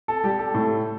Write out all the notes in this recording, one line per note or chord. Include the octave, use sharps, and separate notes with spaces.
A4
G3 G4
A4
A2